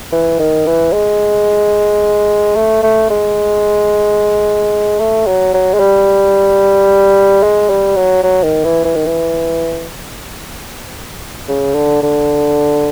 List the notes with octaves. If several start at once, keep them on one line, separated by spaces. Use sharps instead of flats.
E3
D#3
E3
G#3
A3
A3
G#3
A3
F#3
F#3
G#3
G3
G#3
G3
F#3
F#3
D#3
E3
E3
D#3
E3
C#3
D3
D3